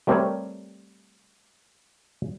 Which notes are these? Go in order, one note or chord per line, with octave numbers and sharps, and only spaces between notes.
G3 A3 C4 G4 A#4 C#5